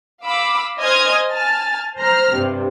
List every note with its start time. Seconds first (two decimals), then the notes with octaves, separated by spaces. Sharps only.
0.24 F5 B5 D6 E6
0.80 C5 D#5 G#5 D#6 F6 G#6
1.31 G#5 A5 F6 A6
1.99 C5 A#5 F6
2.35 G2 C3